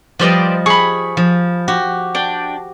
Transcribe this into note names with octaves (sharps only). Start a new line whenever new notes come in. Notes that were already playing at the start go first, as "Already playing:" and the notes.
F3 G3 B4 C5 D5 D#5
G#4 B5 C#6
F3
F#4 G4
D4 G5